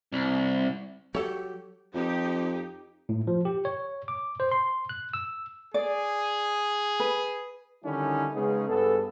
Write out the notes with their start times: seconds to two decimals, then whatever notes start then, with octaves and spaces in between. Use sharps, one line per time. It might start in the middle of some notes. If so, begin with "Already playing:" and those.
0.13 C2
1.15 F#3 G4 A4 C#5
1.94 F2 D#4 G4
3.09 A2
3.27 F3
3.45 G4
3.65 C#5
4.08 D6
4.40 C5
4.52 C6
4.89 F#6
5.13 E6
5.74 G#4 D5
7.00 B4
7.84 D3 D#3 G3 C#4 D#4 E4
8.33 C#3 G#3 B3 C#4 D#4 G#4
8.68 G2 B3 G#4 A4